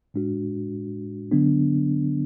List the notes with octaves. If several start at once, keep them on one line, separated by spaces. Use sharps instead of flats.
A2 G#3 D4 F#4
D3 F#3 B3 D4